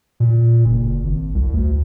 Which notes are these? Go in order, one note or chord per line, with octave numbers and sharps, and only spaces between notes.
A#2
F#1
G#1
C2
D2